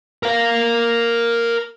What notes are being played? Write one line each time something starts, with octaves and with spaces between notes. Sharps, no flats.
A#4 F5